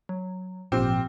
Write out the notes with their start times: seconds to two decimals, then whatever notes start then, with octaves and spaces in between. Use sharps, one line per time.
0.09 F#3
0.72 G#1 A#2 F3 C4 G4 F6